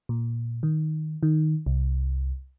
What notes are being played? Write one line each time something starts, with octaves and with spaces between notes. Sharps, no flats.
A#2
D#3
D#3
C2